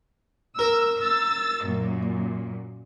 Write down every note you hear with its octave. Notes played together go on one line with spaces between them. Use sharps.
A#4 E6
E6 A6
F#2 A#2